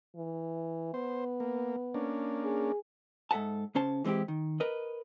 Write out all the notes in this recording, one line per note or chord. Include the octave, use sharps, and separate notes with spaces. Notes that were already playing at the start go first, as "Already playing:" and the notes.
E3
B3 C5
A#3
A#3 C#4 D4
G#4
G#2 A4 E5 F#5 A5
C#3 C#4 C5 A5
E3 G#3 C4 E4 G4
D#3
A#4 B4 D#5